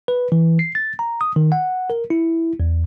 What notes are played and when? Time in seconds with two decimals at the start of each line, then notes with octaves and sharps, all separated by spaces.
0.08 B4
0.32 E3
0.59 C7
0.75 A6
0.99 A#5
1.21 D#6
1.36 D#3
1.52 F#5
1.90 A#4
2.10 E4
2.60 E2